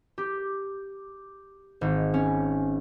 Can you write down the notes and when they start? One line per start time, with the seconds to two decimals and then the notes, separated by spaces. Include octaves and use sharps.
0.18 G4
1.81 G#1
2.14 C#4